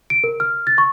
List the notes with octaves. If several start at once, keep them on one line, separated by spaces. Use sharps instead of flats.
D7
A#4
F6
A6
C#6